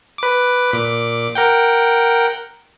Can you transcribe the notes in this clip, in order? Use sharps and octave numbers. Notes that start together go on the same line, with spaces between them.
B4 D6
A#2 D6
A#4 F#5 G5